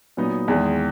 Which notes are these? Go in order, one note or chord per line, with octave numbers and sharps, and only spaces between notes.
A#2 F#3 B3 D#4
E2 D#3 G#3